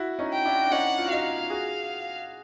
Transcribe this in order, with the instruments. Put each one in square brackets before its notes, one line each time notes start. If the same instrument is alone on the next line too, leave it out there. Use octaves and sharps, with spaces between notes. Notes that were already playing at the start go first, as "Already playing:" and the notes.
Already playing: [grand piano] E4 F#4
C#4 D#4
[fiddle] G5
[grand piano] D4 E4
D4
[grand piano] C#4 D#4 [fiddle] F#5
[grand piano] F4
F#4
[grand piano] D#4 F4 [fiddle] F5
[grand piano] F#4 G#4